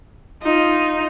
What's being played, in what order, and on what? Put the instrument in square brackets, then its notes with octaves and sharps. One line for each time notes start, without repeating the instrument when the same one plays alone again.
[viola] D#4 [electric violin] F4